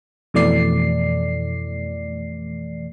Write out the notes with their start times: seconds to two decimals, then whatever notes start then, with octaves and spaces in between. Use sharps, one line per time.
0.34 F2 B2 E3 A3 D5 C7